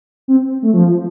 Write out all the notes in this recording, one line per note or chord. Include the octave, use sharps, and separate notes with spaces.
C4
A3
F3